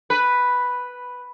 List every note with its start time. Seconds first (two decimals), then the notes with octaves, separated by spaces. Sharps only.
0.10 B4